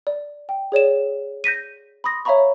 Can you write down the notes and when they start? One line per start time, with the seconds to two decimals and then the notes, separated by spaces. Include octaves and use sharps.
0.07 D5
0.49 G5
0.72 G#4 C#5 D5 E7
1.44 G6 A#6 B6 D#7
2.04 B5 C6 D#6 A#6
2.25 C#5 E5 F5 A#5 B5 C#6